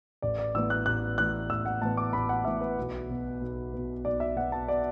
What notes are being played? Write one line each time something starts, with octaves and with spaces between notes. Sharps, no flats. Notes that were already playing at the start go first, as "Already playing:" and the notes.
A1 D5
D5
A2 E3 B3 E6
F#6
A1 F#6
A2 E3 B3 F#6
A1 E6
F#5
A2 E3 B3 A5
D6
A1 B5
F#5
A2 E3 B3 E5
B4
B1
B2 B3
B1
B2 B3
B1 D5
E5
B2 B3 F#5
A5
D5